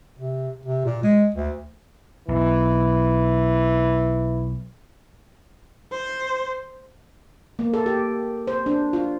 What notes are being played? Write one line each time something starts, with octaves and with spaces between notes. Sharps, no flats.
C3
C3
A#2
G#3
D2
B1 E3
C5
A#3
A4
G4
C5
D4
F4